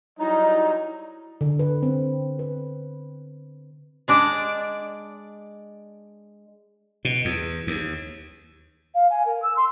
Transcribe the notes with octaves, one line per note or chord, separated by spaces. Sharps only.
F#3 G3 D#4 E4 D#5 A#5
D3
B4
C4
B4
G#3 D4 D5
B2
E2
D#2
F5
G#5
A#4
E6
C6